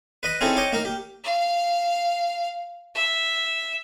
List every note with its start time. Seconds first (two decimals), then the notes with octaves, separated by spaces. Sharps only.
0.23 B4 D#5 B5
0.41 C4 C#4 D#4 E4 G#4 A4
0.57 C#5 D#5 G5 D6
0.73 A#3 D#4 A#4
0.85 G4
1.24 F5
2.95 E5